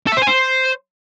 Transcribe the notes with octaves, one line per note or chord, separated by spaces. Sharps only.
A4
E5
C5
G#5
C5